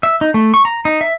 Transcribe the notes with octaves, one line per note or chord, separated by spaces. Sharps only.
E5
D#4
A3
C#6
A#5
D#4
E5